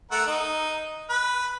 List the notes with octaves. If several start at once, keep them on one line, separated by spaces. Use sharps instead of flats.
A3 A#4 F#5
D#4
B4